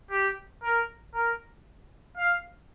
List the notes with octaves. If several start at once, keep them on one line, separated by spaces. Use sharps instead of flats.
G4
A#4
A#4
F5